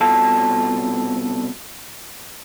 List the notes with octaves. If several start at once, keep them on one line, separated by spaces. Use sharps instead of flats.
C2 B2 F4 A4 A5